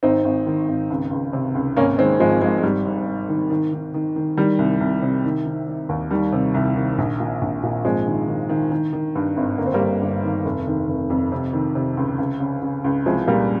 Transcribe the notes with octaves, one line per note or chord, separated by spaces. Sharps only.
G#1 C4 D#4
G#1
D#3
G#1
C#2
C#2
C3
C#2
G#1 A#3 C#4
D#3 G#3 C4
G#1 F3 G#3
G#1 F3 G#3
G#3
G#2 G3
G#2
G#2
D#3
D#3
D#3
D#3
D#3
D#3 G3
C2
C2
C3
D#3
D#3
D#3
D#2
D#3 G3
C3
C2
D#3
A#1
A#2
A#1
A#2
G#1 F3 G#3
D#3
D#3
D#3
D#3
D#3
G2
G#1
G1 A#3
C4
G3 A#3
G1
G1
D#3
F1
D#3
F1
F2
C3
D#3
C3
C#2
C#2
C#3
C#3
C#2
C2 F3 G#3
A#2 G3 A#3